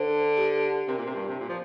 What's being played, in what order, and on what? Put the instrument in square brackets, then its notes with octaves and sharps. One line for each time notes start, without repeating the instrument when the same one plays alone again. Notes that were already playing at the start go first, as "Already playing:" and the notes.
Already playing: [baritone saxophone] D3 [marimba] C5
[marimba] G4
[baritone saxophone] C3 [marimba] A#4
[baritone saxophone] A#2
C3
G2
C3
A#2
F3